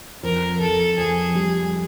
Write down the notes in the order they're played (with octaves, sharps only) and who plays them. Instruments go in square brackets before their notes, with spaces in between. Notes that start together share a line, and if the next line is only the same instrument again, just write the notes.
[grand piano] F2 [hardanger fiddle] A#4
[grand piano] F2 [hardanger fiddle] A4
[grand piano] F2 [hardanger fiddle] G#4
[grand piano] G3